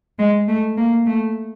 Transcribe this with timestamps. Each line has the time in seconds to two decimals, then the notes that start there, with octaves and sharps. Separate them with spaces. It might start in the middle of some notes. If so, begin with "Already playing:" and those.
0.19 G#3
0.48 A3
0.77 A#3
1.06 A3